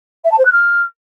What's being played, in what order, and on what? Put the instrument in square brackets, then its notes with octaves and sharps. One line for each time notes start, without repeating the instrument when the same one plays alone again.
[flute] E5
A5
C5
F#6
F6